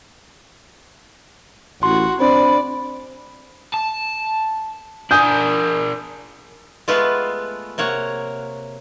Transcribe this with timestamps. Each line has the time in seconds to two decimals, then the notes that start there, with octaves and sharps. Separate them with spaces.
1.83 A1 F#4 C6
2.20 C4 D4 C5 D5 B5
3.74 A5
5.11 D4 A#4 G#5 D#6 G6
6.88 G#3 A3 B3 F4 B4
7.78 C3 A#3 C#5 F#5